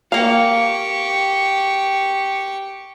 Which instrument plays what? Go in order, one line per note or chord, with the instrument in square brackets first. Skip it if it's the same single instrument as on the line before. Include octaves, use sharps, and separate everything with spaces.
[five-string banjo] A#3 F5 [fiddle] G4 C#6